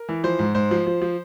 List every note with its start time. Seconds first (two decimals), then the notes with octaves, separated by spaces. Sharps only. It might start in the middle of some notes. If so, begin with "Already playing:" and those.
Already playing: A#4
0.09 E3
0.24 F3 C5
0.39 G#2
0.55 G#2 C5
0.71 F3
0.87 F3
1.02 F3